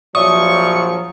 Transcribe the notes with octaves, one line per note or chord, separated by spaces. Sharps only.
A#1 F3 F#3 C#5 D5 E5 C#6 D#6